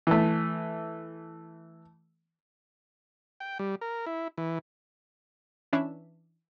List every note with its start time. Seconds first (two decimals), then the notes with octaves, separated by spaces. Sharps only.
0.07 E3 A3
3.40 G5
3.59 G3
3.81 A#4
4.06 E4
4.38 E3
5.73 E3 C#4 D4 E5